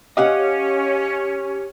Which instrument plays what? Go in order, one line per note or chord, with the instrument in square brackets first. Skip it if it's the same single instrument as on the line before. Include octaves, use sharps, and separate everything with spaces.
[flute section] C#4 [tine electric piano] G4 [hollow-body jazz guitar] D#5 F5 F#5